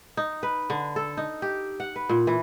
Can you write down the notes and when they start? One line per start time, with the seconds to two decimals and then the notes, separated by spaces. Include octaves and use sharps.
0.17 D#4
0.43 B4
0.70 D3
0.96 A4
1.17 D#4
1.42 G4
1.80 F#5
1.96 B4
2.09 A#2
2.27 E3